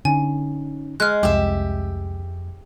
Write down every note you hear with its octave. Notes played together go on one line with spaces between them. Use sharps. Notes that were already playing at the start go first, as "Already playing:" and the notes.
D3 C#4 D#4 G#5
G#3 F6 F#6
C2 F2 G#3 G4 E5